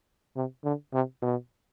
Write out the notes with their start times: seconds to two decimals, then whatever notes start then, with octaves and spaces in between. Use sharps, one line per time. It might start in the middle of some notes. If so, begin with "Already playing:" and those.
0.36 C3
0.64 D3
0.93 C3
1.22 B2